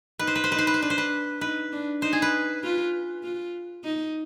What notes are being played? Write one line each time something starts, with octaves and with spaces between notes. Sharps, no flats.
D#4 B4
C5
B4
C5
D#4 B4
C5
B4
C5
D4 B4
C5
B4
D#4 B4
D4
D#4 C5
G#4
B4
F4
F4
D#4